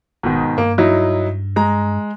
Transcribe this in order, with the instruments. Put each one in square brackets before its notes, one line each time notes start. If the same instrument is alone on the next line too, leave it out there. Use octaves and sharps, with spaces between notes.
[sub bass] E1 [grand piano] G#2 B2 D#3
[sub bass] G2 [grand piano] A#3
[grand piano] F#3 D#4 E4
G#3 A#5